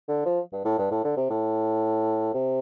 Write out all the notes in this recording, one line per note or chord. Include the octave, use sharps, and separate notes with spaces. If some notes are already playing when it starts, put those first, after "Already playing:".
D3
F3
G2
A2
G2
A2
D3
C3
A2
C3